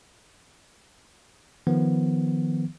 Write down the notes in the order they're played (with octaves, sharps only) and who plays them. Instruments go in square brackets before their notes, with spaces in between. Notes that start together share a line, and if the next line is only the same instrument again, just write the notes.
[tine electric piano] D#3 F3 B3